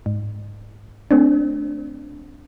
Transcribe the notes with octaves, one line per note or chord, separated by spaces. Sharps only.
G#2
A3 C4 D4